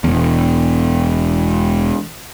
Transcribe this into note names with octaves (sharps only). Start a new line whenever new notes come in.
E1 E2